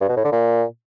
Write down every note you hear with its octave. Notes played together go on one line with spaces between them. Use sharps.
G2
B2
A2
D3
A#2